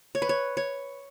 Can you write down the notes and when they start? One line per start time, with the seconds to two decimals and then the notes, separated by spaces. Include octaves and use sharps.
0.15 C#5
0.22 B4
0.29 C#5
0.57 C#5